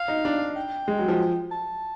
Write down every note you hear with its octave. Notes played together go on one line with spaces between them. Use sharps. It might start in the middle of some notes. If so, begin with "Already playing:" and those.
Already playing: F5
D#4
D4
G5
G#3
F#3
F3
A5